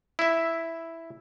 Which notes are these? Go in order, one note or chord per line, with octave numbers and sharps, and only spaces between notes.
E4 E5